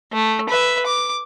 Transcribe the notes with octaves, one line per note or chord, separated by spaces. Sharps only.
A3
B4 E5
D6